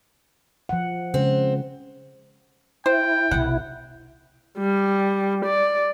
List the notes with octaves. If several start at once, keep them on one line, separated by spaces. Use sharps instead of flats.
F3 F#5
C#3 G#3 C4
E4 C5 G5
B1 C3 F#5
G3
D5